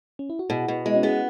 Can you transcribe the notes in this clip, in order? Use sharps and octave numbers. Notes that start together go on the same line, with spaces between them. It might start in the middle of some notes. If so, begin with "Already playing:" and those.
C#4
E4
F#4
B2 E4 G#4
B2
G#3 B3 E4
C#4 F#4
B3 E4 G#4